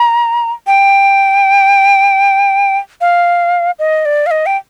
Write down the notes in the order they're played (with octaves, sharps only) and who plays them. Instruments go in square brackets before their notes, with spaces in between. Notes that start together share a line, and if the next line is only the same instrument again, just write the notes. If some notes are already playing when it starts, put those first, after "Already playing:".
Already playing: [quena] A#5
G5
F5
D#5
D5
F5
D#5
G5